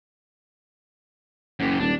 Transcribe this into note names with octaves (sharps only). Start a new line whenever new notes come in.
F#1 F#2 G4
D#1 D4